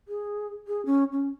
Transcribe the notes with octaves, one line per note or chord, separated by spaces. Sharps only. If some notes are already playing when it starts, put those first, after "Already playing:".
G#4
G#4
C#4
C#4